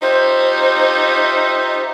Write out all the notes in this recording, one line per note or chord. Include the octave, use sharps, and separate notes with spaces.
D#4 F4 G4 C5 E5